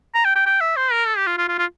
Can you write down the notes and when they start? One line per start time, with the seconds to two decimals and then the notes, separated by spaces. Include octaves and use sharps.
0.15 A#5
0.25 G5
0.35 G5
0.46 G5
0.61 E5
0.76 C5
0.92 A#4
1.07 A4
1.17 G4
1.27 F4
1.38 F4
1.48 F4
1.58 F4